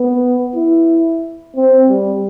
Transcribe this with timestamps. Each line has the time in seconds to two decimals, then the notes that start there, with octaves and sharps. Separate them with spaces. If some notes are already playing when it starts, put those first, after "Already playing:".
Already playing: B3
0.55 E4
1.56 C4
1.89 G3